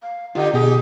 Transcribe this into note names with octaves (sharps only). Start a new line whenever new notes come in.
F5
D3 D#4 F4 G4
B2 D#4 G4 G#4